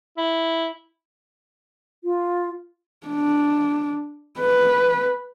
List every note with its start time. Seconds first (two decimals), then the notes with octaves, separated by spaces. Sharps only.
0.18 E4
2.04 F4
3.07 D4
4.40 B4